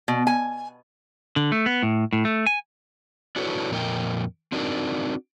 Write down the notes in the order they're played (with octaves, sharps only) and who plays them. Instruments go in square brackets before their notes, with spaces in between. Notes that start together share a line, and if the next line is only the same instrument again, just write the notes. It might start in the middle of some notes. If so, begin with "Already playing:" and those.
[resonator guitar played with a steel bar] B2
G#5
[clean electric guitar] D3
A3
B3
A2
A2
A3
G#5
[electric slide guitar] D4 E4 F#4 A4 B4 C#5
F2 A#2 A#4 D#5 G5
C4 D4 D#4 F#4 A#4 D5